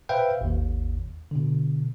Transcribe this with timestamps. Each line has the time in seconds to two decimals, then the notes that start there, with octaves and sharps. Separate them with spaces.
0.09 B4 C5 E5 F5 G5
0.41 G#1 D#2
1.31 B2 D3